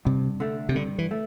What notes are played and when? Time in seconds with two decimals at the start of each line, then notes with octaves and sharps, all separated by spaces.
0.05 G2 C3
0.40 D3 A3
0.69 C3
0.75 G2 D3
0.98 E3
1.11 A3